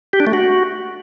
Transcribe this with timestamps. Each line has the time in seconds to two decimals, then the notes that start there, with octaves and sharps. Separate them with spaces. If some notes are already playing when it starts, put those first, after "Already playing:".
0.13 G4
0.20 D4
0.27 A3
0.33 F#4